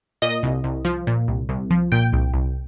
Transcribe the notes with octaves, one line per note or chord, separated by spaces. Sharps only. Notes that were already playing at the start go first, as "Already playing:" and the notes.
A#2 D#5
C2
C2
F3
A#2
C2
C2
F3
A#2 G5
C2
C2